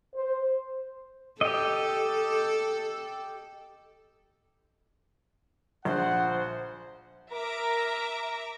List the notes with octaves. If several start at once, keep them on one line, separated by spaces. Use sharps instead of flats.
C5
G4 A4 D#5
A#1 F3 C5 F#5
A#4 E5 A#5 D6